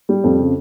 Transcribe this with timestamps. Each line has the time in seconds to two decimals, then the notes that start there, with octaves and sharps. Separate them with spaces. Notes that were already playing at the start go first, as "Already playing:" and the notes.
0.09 G3
0.24 F2
0.39 C#3